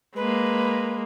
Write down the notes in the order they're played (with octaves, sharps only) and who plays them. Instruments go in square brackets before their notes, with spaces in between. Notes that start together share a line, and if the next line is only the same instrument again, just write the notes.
[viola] G#3 A#3 [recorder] B4